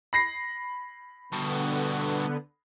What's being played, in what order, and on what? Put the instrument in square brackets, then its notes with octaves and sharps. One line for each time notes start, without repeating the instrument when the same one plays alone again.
[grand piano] B5 A#6 C7
[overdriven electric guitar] G2 B2 [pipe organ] D3 B3